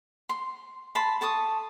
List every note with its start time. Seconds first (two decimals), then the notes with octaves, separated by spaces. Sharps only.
0.29 C6
0.95 A5 B5 C6
1.21 A4 A5 C#6 D#6